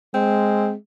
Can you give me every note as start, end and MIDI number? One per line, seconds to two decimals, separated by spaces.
0.14 0.75 56
0.14 0.72 60